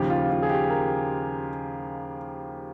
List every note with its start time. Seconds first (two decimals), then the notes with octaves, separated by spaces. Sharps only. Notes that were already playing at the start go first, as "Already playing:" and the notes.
Already playing: D#2 C#3 F3 G4
0.10 F4
0.30 F4
0.42 G#4
0.49 G4
0.70 A#4